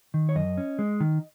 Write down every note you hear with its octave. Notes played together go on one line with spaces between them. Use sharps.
D#3
C#5
F#2 D#5
C#4
G#3
D#3